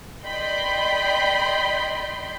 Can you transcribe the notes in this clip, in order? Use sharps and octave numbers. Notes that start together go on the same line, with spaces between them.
D5 D#5 G5 B5 C6 G6